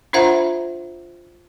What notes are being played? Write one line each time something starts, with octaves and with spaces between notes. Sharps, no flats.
D4 F4 C5 E5 F#5 A#5